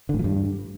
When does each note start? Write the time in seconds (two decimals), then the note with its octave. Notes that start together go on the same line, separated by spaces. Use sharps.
0.09 D3
0.14 A2
0.19 F3
0.24 G2